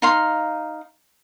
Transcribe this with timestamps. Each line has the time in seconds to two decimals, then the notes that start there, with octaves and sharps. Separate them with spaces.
0.02 D#4 F5 C6